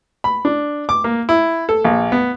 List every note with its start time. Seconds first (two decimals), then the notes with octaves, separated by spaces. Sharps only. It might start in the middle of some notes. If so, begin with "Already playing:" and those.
0.24 B5
0.45 D4
0.89 D6
1.04 A#3
1.29 E4
1.69 A4
1.84 A#1
2.12 B3